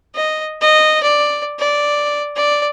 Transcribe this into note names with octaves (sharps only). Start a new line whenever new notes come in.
D#5
D#5
D5
D5
D5